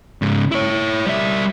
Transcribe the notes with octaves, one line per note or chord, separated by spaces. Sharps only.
G#2 C#3
E4 C#5
G3 E5